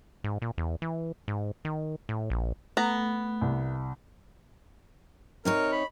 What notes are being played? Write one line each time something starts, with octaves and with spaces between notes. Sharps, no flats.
G#2
A#2
E2
E3
G#2
D#3
A2
A#1
A3 B3 A#5
C2
C3 D#4 A#4 C#5
B5